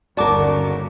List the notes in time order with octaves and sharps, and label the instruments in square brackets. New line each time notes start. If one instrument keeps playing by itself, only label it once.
[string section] G1 D#2 C#3 [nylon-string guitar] F#4 A#4 [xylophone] D5 A5 D6